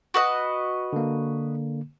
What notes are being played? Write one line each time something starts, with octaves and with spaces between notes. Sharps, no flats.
F#4 B4 D#5
D3 A#3